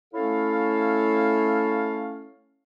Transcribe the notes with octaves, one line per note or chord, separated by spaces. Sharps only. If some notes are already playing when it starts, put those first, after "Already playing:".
A3 C#4 E4 A4 C#5 F5